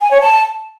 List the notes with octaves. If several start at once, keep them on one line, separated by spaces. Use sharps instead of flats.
G#5
C#5
A5